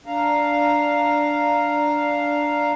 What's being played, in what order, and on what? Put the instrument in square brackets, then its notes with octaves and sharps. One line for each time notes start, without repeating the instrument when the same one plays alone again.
[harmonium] D4 F5 A#5